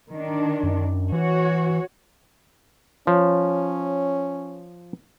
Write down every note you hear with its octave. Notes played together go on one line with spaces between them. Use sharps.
D#3 D4
F#2
E3 F#4 C#5
F3 C#4 C#5